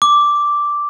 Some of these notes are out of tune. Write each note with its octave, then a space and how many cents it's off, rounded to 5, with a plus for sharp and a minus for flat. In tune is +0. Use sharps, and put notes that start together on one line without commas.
D6 -5